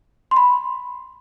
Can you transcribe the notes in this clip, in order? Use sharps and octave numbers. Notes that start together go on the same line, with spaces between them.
C6
B5